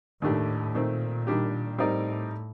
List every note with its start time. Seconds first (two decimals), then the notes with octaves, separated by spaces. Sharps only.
0.22 D#2 A2 D#3 A3 D4 G4
0.75 A#2 D#3 A3 C4
1.27 D#3 G3 D4 G4
1.78 A2 G3 C4 D#4 A#4 D5